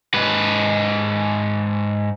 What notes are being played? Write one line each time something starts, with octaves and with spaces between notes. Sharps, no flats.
G#2 B4